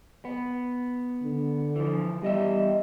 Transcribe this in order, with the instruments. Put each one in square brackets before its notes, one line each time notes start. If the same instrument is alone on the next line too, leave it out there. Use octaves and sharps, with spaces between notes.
[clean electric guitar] B3
[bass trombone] D3
[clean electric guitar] E3 F3
[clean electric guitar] E2 D#5 E5 [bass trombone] G3